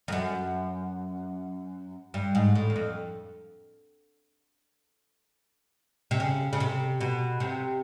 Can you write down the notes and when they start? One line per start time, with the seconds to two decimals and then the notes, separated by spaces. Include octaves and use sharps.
0.08 F2
0.12 F#2
2.14 G2
2.35 G#2
2.55 A2
2.70 E2
2.76 F2
6.11 C3
6.20 C#3
6.53 C#3
6.60 C3
7.01 B2
7.40 C3